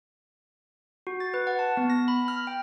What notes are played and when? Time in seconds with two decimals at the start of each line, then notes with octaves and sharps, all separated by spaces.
1.07 F#4
1.20 A6
1.34 B4
1.47 F#5
1.59 A5
1.77 B3
1.90 A#6
2.08 B5
2.28 F6
2.47 G5